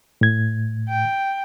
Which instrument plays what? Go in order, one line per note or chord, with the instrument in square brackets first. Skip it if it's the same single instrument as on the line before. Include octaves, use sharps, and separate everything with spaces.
[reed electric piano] A2 G#6
[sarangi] G5